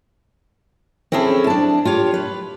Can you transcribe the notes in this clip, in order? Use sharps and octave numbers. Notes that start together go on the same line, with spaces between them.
C4 C#4 E4 G#4 A4
D4 A5
F4 G4 C#5
B4